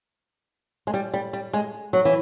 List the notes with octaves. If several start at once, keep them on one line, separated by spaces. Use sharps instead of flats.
G#3
G3
G3
G3
G#3
F#3
E3